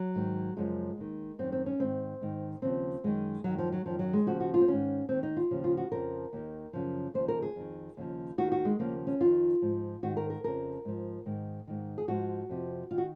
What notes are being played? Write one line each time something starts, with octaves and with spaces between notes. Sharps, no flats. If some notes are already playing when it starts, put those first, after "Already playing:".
Already playing: F#3
G#2 D#3
F#2 C#3 F3 G#3
D#2 D#3
F#2 D#3 C4
C4
C#4
G#2 D#3 C4
G#2 D#3
D#2 C#3 F3 C4
F#2 D#3 G#3
F#2 D#3 F#3
F3
F#3
F#2 D#3 F3
F#3
G#3
D#2 C#3 F3 F#4
F#4
F4
C4
G#2 D#3 C#4
D#2 D#3 C4
D#4
F4
D#2 C#3 F3
F4
F#4
F2 C#3 F3 A#4
D#2 D#3
F#2 C#3 F3
D#2 C#3 F3 C5
A#4
G#4
F2 D#3
D#2 C#3 F3
D#2 D#3 F#4
F#4
G#3
D#2 C#3 F3 A#3
C#4
F2 D#3 F4
G#2 F3
G#2 D#3 F#4
A#4
A#4
F2 C#3 F3 A#4
G#2 F3
G#2 D#3
G#2 D#3
G#4
G#2 F3 F#4
F2 C3 F3
D#3 F4
F#4